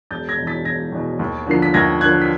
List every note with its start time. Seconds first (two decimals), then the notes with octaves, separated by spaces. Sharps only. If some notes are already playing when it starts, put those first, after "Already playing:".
0.11 E1 G6 A6
0.29 G#6 A#6
0.38 E2 B2
0.47 A6 B6
0.65 E1 G#6 A#6
0.92 E2 B2
1.19 D#2
1.47 D3 F3 A#3 C7
1.62 B6
1.74 D#2 G#6 A#6
2.01 D3 F3 A#3 F#6 G#6
2.21 B6